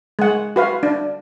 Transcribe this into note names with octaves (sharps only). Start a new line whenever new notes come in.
G#3 F#5
F#4 B4 F5
D4